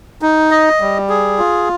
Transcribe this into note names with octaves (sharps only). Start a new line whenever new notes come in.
D#4
D#5
G3
G#4
F4